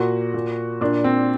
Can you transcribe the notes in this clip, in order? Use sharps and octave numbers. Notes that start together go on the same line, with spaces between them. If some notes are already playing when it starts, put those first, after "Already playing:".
Already playing: A#2 F#4
A#2
A#2 D4
C4